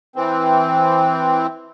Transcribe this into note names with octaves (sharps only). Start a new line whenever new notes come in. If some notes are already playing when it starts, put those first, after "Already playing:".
E3 C4